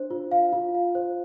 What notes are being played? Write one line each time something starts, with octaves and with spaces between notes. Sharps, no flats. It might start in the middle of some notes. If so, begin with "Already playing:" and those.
Already playing: D4 C5
F4
F5
F4
F5
C5